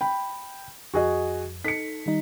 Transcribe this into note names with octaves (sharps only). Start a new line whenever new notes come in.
G5 B5
F2 F#4 G#4 D#5
D#4 A4 B6 C#7
D#3 G3 D#4